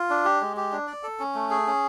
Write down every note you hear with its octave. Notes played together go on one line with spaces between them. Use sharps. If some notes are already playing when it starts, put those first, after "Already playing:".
Already playing: F4
D4
G4
G#3
G4
D4
D5
A4
C#4
A3
G#4
C#4